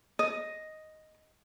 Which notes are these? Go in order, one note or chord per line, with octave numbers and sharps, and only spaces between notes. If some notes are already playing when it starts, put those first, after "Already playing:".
D#5